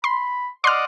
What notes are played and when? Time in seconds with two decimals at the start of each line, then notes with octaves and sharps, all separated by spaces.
0.04 B5 C6
0.64 D5 D#5 F#5 C6 D6 F6